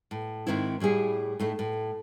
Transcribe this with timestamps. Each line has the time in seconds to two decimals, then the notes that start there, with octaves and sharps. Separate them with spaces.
0.11 A2
0.47 G#2 D#3 C4 E4
0.80 A2 G3 E4 G#4
1.39 A2 A3 D#4
1.59 A2